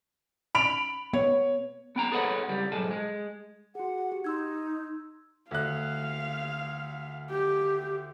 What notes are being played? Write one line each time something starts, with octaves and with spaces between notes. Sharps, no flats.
B5 D7 F7
B3 C#5
B3 G5 A#5
G#4 A4 B4 C#5 E5 F#5
C#2 G3
B1 G#2 G#4 A4
G#3
F#4 G#4 F#5
G4
D#4 C6 E6 G#6
D2 F5 F#6
G4